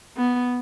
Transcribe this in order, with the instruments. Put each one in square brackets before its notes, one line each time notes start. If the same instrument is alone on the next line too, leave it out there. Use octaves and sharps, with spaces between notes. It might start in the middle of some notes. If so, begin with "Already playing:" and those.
[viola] B3